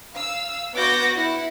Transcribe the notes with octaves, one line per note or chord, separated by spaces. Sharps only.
F5 E6
B3 F#4 D6 G6 A#6
E4 F#5